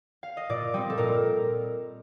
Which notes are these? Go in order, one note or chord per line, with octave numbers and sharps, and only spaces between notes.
F5
D#5
A#2 D5
G3 C4 D#5
A4
A#2 A#4